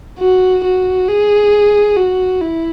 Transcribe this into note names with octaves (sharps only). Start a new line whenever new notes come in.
F#4
F#4
G#4
F#4
E4